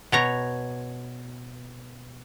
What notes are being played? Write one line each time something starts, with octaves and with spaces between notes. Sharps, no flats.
B2 C#5 A#5